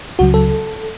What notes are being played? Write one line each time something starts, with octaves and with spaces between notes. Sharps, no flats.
C#2 C#3 F#3 F#4
A4